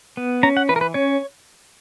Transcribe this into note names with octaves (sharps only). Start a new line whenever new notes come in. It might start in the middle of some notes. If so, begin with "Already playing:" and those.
B3
C#4 A#5
F#5
E3 B4
A#4
B4
C#4 C#5